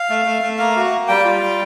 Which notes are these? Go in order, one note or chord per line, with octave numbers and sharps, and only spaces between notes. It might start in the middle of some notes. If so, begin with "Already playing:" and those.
Already playing: F5
A3
A3
A3
A#3 F5
F#4
A#3
G3 G5
F4
G3